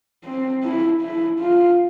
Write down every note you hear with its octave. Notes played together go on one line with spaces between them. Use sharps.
C4
E4
E4
F4